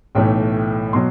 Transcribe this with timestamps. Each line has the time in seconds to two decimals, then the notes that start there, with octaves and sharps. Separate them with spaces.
0.15 B1 A2 E3 A3 G5
0.93 B2 F#3 C6